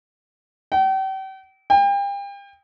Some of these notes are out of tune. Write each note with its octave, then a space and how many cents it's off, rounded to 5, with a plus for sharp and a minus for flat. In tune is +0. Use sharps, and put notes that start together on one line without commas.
G5 -40
G5 +35